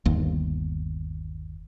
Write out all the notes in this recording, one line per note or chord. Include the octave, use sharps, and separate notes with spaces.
G1 D#2